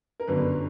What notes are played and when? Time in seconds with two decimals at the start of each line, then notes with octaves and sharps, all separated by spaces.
0.20 A#4
0.27 G1 F#2 D3 B4